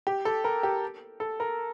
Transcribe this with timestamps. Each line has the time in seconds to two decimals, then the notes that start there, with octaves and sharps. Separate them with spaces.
0.07 G4
0.25 A4
0.44 A#4
0.63 G4
1.20 A4
1.40 A#4